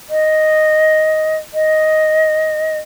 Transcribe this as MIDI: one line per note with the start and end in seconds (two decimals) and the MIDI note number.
0.10 1.35 75
1.54 2.78 75